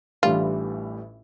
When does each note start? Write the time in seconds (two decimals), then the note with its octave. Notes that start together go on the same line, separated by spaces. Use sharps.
0.23 A1 A2 E3 G3 D4 F4